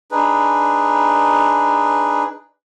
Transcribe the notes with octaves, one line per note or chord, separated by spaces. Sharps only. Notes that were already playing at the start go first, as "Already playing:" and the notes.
D4 D#4 G#4 B4